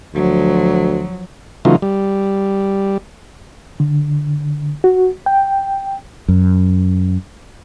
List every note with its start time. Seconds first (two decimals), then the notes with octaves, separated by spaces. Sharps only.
0.15 D2 F3 F#3
1.65 C#3 E3 F#3 A3 D#4 F4
1.82 G3
3.80 D3
4.84 F#4
5.26 G5
6.28 F#2